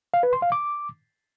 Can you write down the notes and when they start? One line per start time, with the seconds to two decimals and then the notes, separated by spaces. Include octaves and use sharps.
0.14 F5
0.23 B4
0.33 C6
0.42 F5
0.52 D6